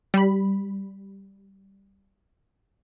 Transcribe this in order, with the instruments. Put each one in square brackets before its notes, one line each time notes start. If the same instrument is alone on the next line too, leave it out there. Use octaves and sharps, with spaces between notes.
[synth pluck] G3 B5